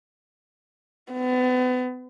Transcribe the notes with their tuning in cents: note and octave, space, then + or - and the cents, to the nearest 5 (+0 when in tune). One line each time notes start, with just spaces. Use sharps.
B3 +35